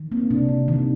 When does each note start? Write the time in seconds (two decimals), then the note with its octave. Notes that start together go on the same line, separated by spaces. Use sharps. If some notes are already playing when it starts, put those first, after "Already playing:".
Already playing: D#3
0.12 A#3 C4
0.31 C3 D4
0.49 C3
0.68 D#3